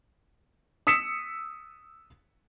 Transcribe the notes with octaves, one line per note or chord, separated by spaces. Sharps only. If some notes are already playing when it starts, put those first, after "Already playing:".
D#6 E6 B6 C#7 E7